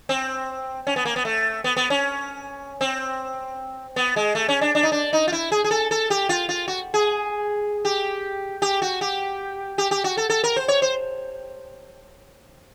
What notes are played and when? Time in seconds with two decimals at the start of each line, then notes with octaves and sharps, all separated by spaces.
0.09 C4
0.87 C#4
0.96 B3
1.05 A#3
1.16 B3
1.25 A3
1.64 B3
1.77 B3
1.90 C#4
2.81 C4
3.96 B3
4.16 G#3
4.35 A3
4.49 C#4
4.61 D4
4.75 D4
4.83 D#4
4.92 D4
5.13 D#4
5.28 F4
5.32 E4
5.52 G#4
5.64 G#4
5.71 A4
5.91 A4
6.10 G4
6.29 F4
6.49 F4
6.68 F#4
6.94 G#4
7.85 G4
8.62 G4
8.82 F#4
9.01 G4
9.78 G4
9.91 G4
10.04 F#4
10.17 A4
10.30 A4
10.44 A#4
10.56 C5
10.68 C#5
10.82 C5